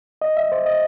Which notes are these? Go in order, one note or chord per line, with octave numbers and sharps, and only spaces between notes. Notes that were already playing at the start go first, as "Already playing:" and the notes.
D#5
E5
C5
D#5